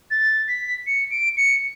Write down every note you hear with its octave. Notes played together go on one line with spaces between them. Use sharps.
A6
B6
C#7
D7
C#7